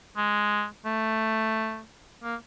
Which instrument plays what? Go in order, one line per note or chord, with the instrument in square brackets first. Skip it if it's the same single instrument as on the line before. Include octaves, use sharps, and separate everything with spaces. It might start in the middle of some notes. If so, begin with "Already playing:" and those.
[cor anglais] G#3
A3
A#3